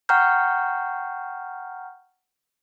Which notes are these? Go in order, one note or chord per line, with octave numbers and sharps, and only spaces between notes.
F#5 G5 A#5 C#6 F6 G6